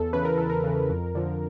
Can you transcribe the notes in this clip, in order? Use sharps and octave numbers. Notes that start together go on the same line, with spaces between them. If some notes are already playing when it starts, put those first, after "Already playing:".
Already playing: E2 A4
C#3 E3 B4
A#4
E2 A4
A#4
C#3 E3
F2
D3 F3